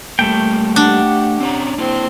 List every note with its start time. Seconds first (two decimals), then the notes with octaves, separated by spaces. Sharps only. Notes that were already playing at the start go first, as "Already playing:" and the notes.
0.19 G3 A3 A#3 G5
0.76 D4 G4 F#5
1.41 C4 C#4 A#5
1.78 A#3 C4 E4 C6